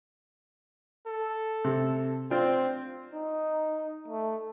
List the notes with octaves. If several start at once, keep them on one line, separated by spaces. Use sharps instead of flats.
A4
C3
C4 D4 F4 G5
D#4
A3